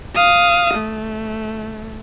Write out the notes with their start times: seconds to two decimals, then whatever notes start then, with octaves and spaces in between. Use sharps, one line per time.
0.15 F5 D#6
0.74 A3